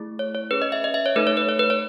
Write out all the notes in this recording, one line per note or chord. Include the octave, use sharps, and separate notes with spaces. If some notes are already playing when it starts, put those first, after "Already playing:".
Already playing: A3 E4 G#4
C#5
C#5
C#4 G#4 B4
D#5
E5
D#5
E5
C#5
A3 D#4 A4 B4
C#5
B4
C#5
B4
C#5